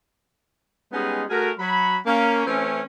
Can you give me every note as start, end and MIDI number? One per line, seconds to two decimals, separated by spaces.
0.93 1.24 55
0.93 1.24 56
0.93 1.24 59
0.93 1.24 61
0.93 1.24 63
0.93 1.24 68
1.30 1.51 57
1.30 1.51 66
1.30 1.51 68
1.30 1.51 70
1.59 1.98 54
1.59 1.98 83
2.06 2.43 58
2.06 2.43 61
2.47 2.82 52
2.47 2.82 57
2.47 2.82 60
2.47 2.82 61